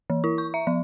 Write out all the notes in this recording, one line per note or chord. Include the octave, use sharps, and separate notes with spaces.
E3
E4
C#6
E5
F3